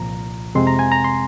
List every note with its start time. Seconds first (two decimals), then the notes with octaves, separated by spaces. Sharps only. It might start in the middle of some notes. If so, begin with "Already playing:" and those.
Already playing: C2 A#2 F3 A#5
0.55 F2 C3 G#3 C4 C6
0.67 A#5
0.79 G#5
0.92 A#5
1.04 C6